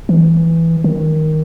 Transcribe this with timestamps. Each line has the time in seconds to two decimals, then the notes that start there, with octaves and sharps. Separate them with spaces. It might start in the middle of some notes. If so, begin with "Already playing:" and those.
0.09 E3
0.84 D#3